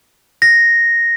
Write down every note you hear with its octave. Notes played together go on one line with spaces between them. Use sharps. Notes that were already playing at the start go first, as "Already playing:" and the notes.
A#6